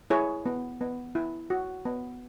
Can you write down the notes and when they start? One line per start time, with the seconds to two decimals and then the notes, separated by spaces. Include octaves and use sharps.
0.10 E4 G#4 C#5
0.46 B3
0.81 B3
1.15 E4
1.50 F#4
1.85 B3